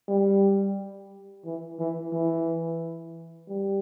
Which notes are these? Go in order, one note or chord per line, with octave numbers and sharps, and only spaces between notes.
G3
E3
E3
E3
G3